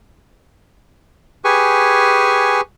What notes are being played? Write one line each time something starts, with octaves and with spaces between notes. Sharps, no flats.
G4 G#4 B4 G#5 C#6